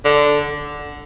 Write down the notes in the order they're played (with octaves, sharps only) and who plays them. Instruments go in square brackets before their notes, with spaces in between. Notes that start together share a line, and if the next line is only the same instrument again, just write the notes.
[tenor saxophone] D3